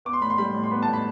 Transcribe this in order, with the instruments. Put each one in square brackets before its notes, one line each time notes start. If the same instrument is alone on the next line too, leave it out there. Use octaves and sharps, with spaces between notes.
[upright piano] B3 D6
C6
A2 B5
C6
G3 B5
A2
C6
B3 B5
A5
A2
B5